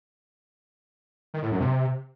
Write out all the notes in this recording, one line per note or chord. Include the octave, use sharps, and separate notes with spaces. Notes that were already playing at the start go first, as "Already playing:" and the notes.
D#3
A2
F#2
C3